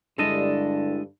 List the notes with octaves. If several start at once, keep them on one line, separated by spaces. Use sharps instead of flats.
G2 D3 G#3 D4 E4 A4 D#5